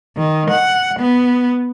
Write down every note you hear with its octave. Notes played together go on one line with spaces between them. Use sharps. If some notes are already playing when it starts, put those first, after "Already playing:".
D#3
F#5
B3